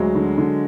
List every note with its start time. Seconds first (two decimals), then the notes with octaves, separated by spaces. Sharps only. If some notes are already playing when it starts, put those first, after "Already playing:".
Already playing: D2 F#3 G#3
0.15 D3
0.38 D3